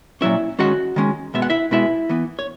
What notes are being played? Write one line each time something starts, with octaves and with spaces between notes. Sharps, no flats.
A#2 F#3 C#4 E4 E5
D#3 G#3 C#4 F#4 F#5
D#3 G#3 C#4
B2 G#3 B3 E5
F#5
E4 E5
B2 G#3 B3 E4 E5
E3 B3
C#5